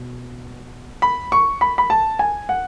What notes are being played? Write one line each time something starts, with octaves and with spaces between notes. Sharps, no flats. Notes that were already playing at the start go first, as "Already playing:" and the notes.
Already playing: B2
B5
C#6
B5
B5
A5
G#5
F#5